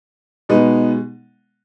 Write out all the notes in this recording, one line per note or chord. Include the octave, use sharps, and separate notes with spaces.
B2 G#3 B3 D#4